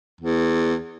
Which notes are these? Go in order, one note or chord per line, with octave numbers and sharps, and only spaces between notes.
E2